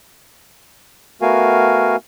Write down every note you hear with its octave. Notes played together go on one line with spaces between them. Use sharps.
A3 B3 F#4 A#4 F5 G#5